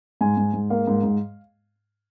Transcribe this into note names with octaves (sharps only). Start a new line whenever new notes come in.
G#2 G#5
G#2
G#2
A#3 F5
G#2
G#2